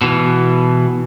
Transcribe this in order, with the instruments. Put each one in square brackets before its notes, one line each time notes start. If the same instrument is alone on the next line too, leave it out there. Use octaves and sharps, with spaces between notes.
[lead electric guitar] B2 E3